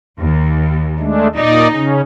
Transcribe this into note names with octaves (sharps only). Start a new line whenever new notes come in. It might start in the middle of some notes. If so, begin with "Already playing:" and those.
D#2
G#3 A3 D4
A#2 D#4 D5 D#5
C#3 C#4